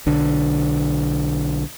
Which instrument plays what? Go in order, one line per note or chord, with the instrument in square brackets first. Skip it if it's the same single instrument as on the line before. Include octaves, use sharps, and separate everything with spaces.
[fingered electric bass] B1 D3